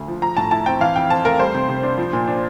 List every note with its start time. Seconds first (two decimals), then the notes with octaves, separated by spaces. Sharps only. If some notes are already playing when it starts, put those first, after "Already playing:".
Already playing: D2
0.08 F3
0.22 F3 A#5
0.37 A2 A5
0.51 E4 A5
0.66 C4 G5
0.81 E3 F5
0.96 F2 G5
1.10 C4 A5
1.25 A3 A#4
1.40 G3 C5
1.54 C3
1.69 C3
1.83 D4
1.98 F3
2.13 A#2
2.28 D4